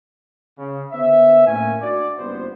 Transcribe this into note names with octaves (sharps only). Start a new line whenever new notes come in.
C#3
D3 B3 B4 C5 E5
A2 A#3 C#4 G#5
D4 F#4 D5
F#1 G2 B3 C5